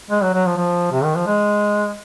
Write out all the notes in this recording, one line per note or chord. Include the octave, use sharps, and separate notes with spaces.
G#3
F#3
F#3
F3
F3
C3
D#3
F3
G#3